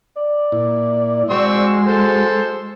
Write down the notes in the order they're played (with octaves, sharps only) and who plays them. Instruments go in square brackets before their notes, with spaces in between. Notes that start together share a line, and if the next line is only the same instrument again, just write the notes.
[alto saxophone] D5
[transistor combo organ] A#2 E4
[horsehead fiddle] G#3 [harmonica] C4 C#6 E6 [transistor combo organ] F#4 G#4 C6
[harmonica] A4 C5